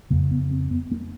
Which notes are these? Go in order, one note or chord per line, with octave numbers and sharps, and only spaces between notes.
F2 C#3 A#3
B3
C4
B3
A#3